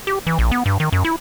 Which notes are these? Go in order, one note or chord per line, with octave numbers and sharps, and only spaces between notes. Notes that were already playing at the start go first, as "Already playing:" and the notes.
G4
E3
A#1
B3
G2
D#3
F#2
E4